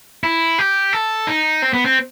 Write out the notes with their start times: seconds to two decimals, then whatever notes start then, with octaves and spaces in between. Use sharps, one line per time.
0.24 E4
0.59 G4
0.93 A4
1.27 D#4
1.62 C4
1.73 B3
1.85 C4